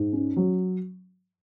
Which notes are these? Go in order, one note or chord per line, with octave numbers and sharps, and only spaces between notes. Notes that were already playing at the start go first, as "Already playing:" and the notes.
Already playing: G#2
C#4
F#3